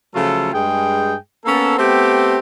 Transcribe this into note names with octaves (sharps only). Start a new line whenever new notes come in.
C#3 F3 F#3 A3 F4 A4
G2 G#3 G#4 G5
A#3 B3 C#4 A4
A3 B3 C4 G4